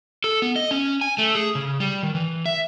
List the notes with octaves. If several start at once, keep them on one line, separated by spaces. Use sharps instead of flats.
A4
B3
D#5
C#4
G#5
A3
G#4
C#3
G3
D#3
E3
E5